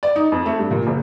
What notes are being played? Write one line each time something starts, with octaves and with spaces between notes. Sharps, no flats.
D5
D#4
F2
A3
G2
A#2
F#1